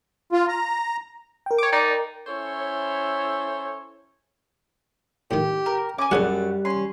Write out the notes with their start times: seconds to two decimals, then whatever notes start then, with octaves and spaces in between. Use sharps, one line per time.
0.32 F4
0.48 A#5
1.46 A#4 G5
1.58 C#5 D6
1.73 D#4 D5
2.27 C#4 E4 A4 C5 C#5
5.31 A2 D#3 G4
5.66 A#4
5.98 C#4 G#5 D6
6.11 F#2 G3 D4 F#4 G#4 C#5 C#6
6.65 C#4 C6